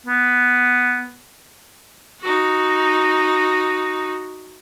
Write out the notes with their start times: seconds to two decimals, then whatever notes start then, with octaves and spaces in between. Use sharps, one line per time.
0.06 B3
2.21 D#4 F#4